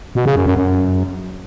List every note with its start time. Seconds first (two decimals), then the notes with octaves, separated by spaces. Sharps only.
0.15 B2
0.26 C#3
0.36 F#2
0.46 F#2
0.57 F#2